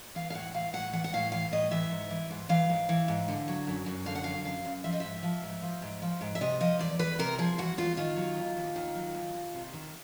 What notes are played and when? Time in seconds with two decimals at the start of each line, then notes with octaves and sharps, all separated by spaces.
0.15 E3 F5
0.30 F5
0.34 A2 F#5
0.54 E3 F5
0.73 A2 F#5
0.93 E3 F#5
1.04 F#5
1.13 A2 F5
1.32 E3 F5
1.52 A2 D#5
1.71 E3 E5
1.91 G#2
2.10 E3
2.31 G#2
2.49 E3 F5
2.70 G#2
2.89 E3
3.08 G#2
3.28 D3
3.48 F#3
3.67 F#2
3.86 F#2
4.06 D3 F5
4.15 F#5
4.24 F#3 F5
4.45 F#2 F5
4.65 F#2
4.84 F3 E5
4.92 D#5
5.00 G#2 E5
5.23 F3
5.43 G#2
5.62 F3
5.82 G#2
6.02 F3
6.21 G#2
6.35 E5
6.41 C3 D#5
6.61 F3 D#5
6.79 E2 D5
6.99 E2 B4
7.19 C3 A#4
7.38 F3 G#4
7.58 E2 F#4
7.78 E2 F4
7.97 D#3 F4
8.16 F#3
8.37 D#2
8.57 D#2
8.76 D#3
8.95 F#3
9.15 D#2
9.34 D#2
9.54 C3
9.73 D#3